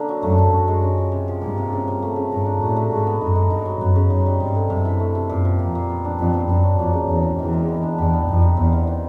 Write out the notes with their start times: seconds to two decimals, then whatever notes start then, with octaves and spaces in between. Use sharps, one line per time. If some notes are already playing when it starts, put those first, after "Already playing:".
Already playing: D3 A#3 D4
0.09 F#3
0.23 F#2 A3
0.38 D3
0.53 F#2 F#4
0.68 G#3
0.82 C#4
0.98 F3
1.12 C3
1.28 F3
1.42 G2 A#3
1.58 C3
1.73 C#3
1.88 F3
2.02 A3
2.16 C#3
2.32 G2 A#4
2.46 D4
2.61 A2 F#4
2.76 A3
2.91 G#2 F#4
3.07 B3
3.21 F#2 D#4
3.35 G#3
3.50 G2 D#4
3.65 F#3
3.81 F#2 B3
3.96 C#3
4.10 F#2 D#4
4.26 G3
4.40 G2 C4
4.55 D3
4.70 F#2 C3
4.85 E3
5.00 A3
5.15 C3
5.29 F#2 A#2
5.45 F3
5.59 F2 A#3
5.75 A#2
5.89 B3
6.05 D4
6.19 F2 G4
6.33 B3
6.49 F#2 D4
6.63 F#3
6.79 F2 A#3
6.93 C#3
7.09 E2 G#4
7.23 C4
7.38 E2 D#4
7.53 G#3
7.68 B3
7.83 D4
7.98 E2 G4
8.13 B3
8.28 F2 D#4
8.42 G3
8.57 E2 C4
8.73 E3
8.87 D#3